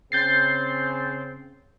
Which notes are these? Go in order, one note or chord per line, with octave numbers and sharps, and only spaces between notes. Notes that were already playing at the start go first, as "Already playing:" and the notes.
C#3 C4 G6 A6 C7